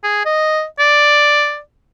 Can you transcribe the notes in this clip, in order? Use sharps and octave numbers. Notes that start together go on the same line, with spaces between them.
G#4
D#5
D5